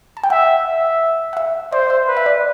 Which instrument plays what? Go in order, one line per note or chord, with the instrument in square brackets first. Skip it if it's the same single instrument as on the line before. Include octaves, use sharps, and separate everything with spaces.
[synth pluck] A5
G5
[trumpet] E5 [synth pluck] F#5
[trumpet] E5
[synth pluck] F#5
E5
[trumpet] C5 [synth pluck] D5
[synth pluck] E5
[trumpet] B4
[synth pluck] E5
D5